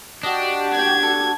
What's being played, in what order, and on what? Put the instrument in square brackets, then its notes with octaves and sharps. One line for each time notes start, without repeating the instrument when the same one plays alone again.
[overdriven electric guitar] D4 [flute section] F#4 G4 [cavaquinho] D#5
[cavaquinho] D5 G5 [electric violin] G#6
[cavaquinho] A4